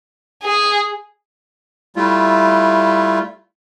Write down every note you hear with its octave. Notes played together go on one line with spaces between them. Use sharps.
G#4
G3 A3 E4 F4